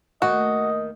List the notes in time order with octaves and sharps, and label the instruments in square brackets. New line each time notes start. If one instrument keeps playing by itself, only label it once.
[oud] D#2 D#3 A3 [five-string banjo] F#4 [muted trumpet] D#5